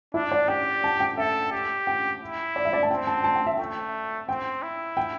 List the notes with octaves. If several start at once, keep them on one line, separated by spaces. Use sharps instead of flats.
D4 E4
D5
G4 G5
A5
G5
A4 E5
G4
G5
E4
D5
E5
D5
A5
C4 G5
A5
A5
G5
E5
A3 G5
C4 G5
E4
G5